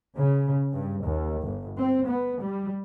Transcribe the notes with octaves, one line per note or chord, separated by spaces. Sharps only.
C#3
G2
D#2
G1
C4
B3
G3